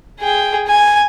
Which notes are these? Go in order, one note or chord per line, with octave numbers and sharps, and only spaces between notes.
G#4 G5
G#5